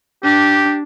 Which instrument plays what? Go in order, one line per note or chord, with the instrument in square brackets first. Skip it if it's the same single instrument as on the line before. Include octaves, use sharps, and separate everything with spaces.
[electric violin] D4 [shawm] G4